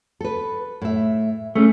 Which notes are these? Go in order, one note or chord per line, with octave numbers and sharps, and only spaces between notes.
A4 B4
A2 E5
A3 C#4 G#4